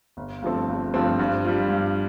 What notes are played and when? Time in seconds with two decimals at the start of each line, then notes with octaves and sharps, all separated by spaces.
0.17 G1
0.42 G2 F3 A3 C4
0.68 G1
0.94 G2 F3 A3 C4
1.19 G2
1.45 G3 F4
1.70 G2